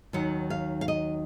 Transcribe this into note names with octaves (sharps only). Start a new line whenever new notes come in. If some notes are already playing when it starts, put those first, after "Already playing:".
D#2 D#3 F#3 F#5
F5
F5
D#5